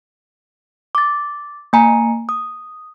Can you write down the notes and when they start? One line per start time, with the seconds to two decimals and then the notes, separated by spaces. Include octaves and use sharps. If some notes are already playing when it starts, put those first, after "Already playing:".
0.95 D6 A6
1.73 A#3 G#5 A#5
2.29 D#6